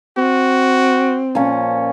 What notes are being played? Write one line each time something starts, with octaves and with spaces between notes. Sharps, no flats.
C4 F#4
A#2 F3 C#4